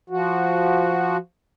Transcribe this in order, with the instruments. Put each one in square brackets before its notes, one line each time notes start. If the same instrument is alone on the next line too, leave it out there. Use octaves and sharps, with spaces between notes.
[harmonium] F3 F#4